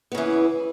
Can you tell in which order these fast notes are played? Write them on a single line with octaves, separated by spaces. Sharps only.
B3 C#3 E3